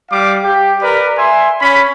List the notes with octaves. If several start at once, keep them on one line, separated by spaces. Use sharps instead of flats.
G3 F5 D6
G4
A#4 B4 D5
E5 G#5 C6
C#4 B5